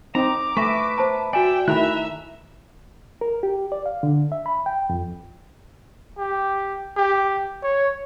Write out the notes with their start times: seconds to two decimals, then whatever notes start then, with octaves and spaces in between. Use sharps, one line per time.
0.15 C4 D#4 A#5 D6
0.57 A3 B4 E5 C#6 A#6
0.98 C5 A5 A#5
1.33 F#4 D5 E5 G5 G#5
1.68 D#3 A3 E4 E5 A#5 F#6
3.21 A#4
3.43 G4
3.72 D5
3.86 F5
4.03 D3
4.32 E5
4.46 B5
4.66 G5
4.90 F2
6.18 G4
6.97 G4
7.63 C#5